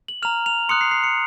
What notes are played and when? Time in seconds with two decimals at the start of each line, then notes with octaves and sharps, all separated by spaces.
0.08 F#7
0.22 A#5 F6 F7
0.46 F7
0.69 C6 D#6 F#6 C#7
0.81 C7
0.91 C7
1.04 C#7